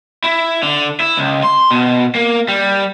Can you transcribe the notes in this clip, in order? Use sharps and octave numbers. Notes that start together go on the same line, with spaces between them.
E4
D3
E4
C#2
C6
B2
A#3
G3